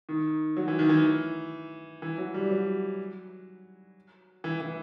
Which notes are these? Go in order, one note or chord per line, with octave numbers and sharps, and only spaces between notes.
D#3
F#3
E3
D#3
E3
E3
F#3
G3
F#3
E3
E3